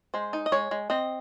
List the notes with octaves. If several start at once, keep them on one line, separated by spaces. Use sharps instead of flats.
G#3 C5
D#4
D#5
G#3 C#5
G#3
C4 D#5